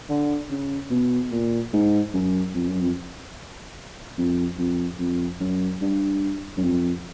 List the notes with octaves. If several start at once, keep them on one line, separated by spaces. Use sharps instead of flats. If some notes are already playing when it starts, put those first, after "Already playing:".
D3
C#3
B2
A#2
G#2
F#2
F2
F#2
F2
F2
F2
F2
F#2
G2
F#2
F2